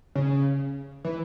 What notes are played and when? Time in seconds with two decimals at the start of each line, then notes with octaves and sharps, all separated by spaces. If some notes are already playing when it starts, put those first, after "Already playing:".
0.15 C#3
1.05 E3